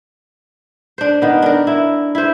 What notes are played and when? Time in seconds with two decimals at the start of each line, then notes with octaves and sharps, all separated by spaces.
0.98 D4 C5
1.22 D#3 B3
1.42 D4 A#4
1.67 E4
2.15 E4 C5